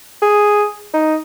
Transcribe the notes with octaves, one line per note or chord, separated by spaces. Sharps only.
G#4
D#4